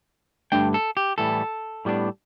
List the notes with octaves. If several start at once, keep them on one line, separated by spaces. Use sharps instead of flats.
G2 D3 A3 D4 G5
A4
G4
A2 E3 G3 A4
A2 G3 B3 D4